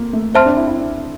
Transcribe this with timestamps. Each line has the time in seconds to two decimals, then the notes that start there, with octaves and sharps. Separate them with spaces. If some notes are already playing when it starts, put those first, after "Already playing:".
Already playing: A#3 F4
0.13 A3
0.35 C4 C5 E5 A5 C6 F6
0.46 D4
0.57 E4
0.67 E4
0.77 D4